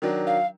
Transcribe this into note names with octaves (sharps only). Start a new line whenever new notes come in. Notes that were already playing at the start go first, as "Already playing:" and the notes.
D#3 F#3 D4
F5